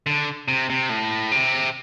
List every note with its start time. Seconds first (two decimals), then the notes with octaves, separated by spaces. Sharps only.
0.06 D3
0.48 C3
0.70 C3
0.89 A2
1.32 C3